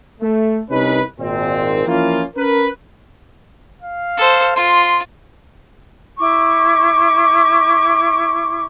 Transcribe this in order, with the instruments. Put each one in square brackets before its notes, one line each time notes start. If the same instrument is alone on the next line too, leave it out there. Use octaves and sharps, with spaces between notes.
[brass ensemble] A3
C2 C3 C#4 D#4 B4
G#1 A#2 C4
E3 F3 A#3 C#4 E4 F4
C#4 A#4 B4
[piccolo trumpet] F5
[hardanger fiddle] A4 C5
[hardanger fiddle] F4 [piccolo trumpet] C6
[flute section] E4 C#6 D6